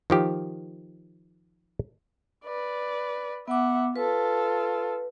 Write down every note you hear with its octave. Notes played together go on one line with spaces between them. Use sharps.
D#3 F3 G4
B4 D5
B3 E5 F#5 D6
F4 A4 B4